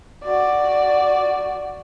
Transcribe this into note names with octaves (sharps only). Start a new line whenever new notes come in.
F#4 D5